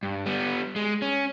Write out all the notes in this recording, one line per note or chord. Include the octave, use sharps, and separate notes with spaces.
G2
G3 B3
G#3
C#4